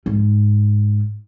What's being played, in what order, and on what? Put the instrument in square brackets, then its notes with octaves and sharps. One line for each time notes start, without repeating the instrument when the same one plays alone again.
[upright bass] G#2